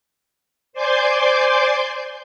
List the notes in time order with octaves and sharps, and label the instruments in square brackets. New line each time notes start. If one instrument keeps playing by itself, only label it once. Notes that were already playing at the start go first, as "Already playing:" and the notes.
[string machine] C5 D5 G#5 C6 D6 G6